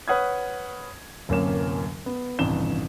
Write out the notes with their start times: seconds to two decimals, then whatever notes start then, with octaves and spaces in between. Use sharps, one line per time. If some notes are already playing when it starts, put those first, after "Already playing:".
0.08 B4 C#5 F#5 D#6 F6 G#6
1.29 D1 F#2 C3 A#3 C#5 E7
2.06 B3
2.39 D#1 A1 G2 C3 E7 G7